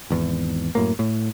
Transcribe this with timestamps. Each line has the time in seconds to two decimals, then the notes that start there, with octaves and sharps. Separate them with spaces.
0.10 G#1 E2
0.75 F#2 A2 A#3
0.99 A2